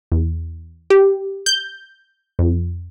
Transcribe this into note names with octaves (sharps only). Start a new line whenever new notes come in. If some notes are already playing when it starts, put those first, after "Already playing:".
E2
G4
G6
F2